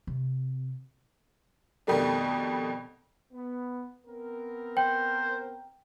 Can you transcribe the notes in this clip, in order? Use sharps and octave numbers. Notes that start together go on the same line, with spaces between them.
C3
F2 B2 D#3 G3 A3 D4
B3
B3 C4 A#4
C5 G5